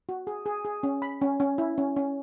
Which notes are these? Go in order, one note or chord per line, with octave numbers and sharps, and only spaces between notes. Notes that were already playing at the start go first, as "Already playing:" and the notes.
F#4
G#4
G#4
G#4
C#4
B5
C#4
C#4
E4
C#4
C#4